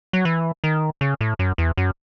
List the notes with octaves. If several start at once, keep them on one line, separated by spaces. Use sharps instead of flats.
F#3
E3
D#3
C#3
A2
F#2
E2
F#2